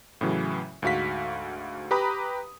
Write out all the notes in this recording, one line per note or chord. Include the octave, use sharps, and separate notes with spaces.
A2 C#3 E3 F#3
D2 G#2 F#4 F5 B6
G4 B4 A#5 B5 D#6